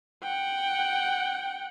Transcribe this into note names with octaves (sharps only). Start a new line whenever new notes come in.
F#5 G5